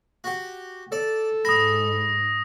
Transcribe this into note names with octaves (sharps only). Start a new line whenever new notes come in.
F#4 G4
A4 D5
G#2 B5 D#6 A#6